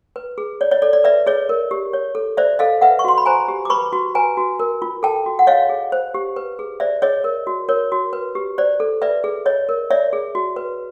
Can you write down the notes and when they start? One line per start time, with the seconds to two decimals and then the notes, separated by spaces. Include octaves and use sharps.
0.16 B4
0.38 G#4
0.61 C#5 D5
0.71 C#5 D#5
0.82 A4 D5
0.93 D5
1.04 B4 D5 E5
1.26 G#4 C#5 D#5
1.49 A#4
1.71 G4
1.93 C#5
2.15 A4
2.37 C5 D5 E5
2.59 A4 D#5 F5
2.81 B4 E5 F#5
2.99 C#6
3.05 F#4 C6
3.18 B5
3.26 C5 G#5 A#5
3.48 G4
3.65 D6
3.70 B4 B5 C#6
3.93 F#4
4.15 B4 G#5 A#5
4.37 F#4
4.60 A#4
4.82 F4
5.03 A4 G5 A5
5.26 F#4
5.39 F#5
5.47 C#5 D#5 F5
5.69 G#4
5.92 C5
6.14 G4
6.36 B4
6.59 G#4
6.80 C5 D5 E5
7.02 G#4 C#5 D#5
7.24 A#4
7.47 F#4
7.69 A#4 C#5
7.92 F#4
8.13 B4
8.35 G4
8.58 C5 D5
8.80 A4
9.02 B4 D5 E5
9.24 G#4
9.46 C#5 D#5
9.69 A#4
9.91 C#5 D5 E5
10.13 G#4
10.35 F#4
10.56 B4